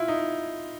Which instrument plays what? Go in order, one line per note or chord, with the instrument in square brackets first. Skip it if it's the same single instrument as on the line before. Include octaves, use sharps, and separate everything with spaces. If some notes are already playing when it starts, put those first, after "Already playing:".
Already playing: [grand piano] E4 F4
D#4